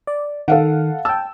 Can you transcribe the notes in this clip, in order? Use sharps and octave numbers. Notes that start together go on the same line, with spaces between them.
D5
D#3 A4 F5 F#5
G5 A5 E6